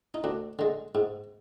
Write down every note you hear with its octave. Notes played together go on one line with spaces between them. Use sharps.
D#4
D2 D4
D3 G#3
G#2